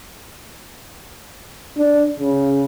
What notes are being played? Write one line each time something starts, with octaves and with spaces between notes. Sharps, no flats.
D4
C#3